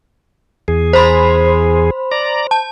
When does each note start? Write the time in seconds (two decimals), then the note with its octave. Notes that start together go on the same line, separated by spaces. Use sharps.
0.68 E2 G#4
0.93 C5 B5 C6
2.12 D5 A#5
2.51 A5